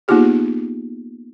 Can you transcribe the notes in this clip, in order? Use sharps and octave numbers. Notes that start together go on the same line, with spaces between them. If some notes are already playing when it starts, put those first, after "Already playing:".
A#3 B3 D#4 F4 G4 G#4